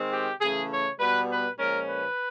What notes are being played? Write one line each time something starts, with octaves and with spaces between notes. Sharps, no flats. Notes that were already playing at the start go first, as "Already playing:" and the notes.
Already playing: D#3 G#3 C4
G4
C#3 E3 A3 G#4
C#5
B2 G3 B3 B4
B4
A#2 F3 G#3 C#4 A#4
B4